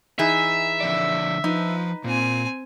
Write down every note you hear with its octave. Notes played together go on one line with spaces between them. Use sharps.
E3 D#4 G#4 E5
D3 F3 D5
F3 D#4 B4
A#2 C4 G#5